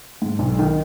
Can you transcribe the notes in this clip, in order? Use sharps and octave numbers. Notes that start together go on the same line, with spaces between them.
G#2
B1
D#3